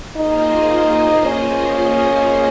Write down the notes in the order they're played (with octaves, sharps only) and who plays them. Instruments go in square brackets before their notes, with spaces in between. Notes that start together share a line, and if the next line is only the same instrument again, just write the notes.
[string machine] A#3 F4 G#4 C5 D#5 [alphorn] D#4
[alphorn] C#4